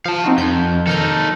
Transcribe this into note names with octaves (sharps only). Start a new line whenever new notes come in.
F3 F5 A5
C4 D#4 F#4
F2 G6
D#3 D#4 A4 F6 G6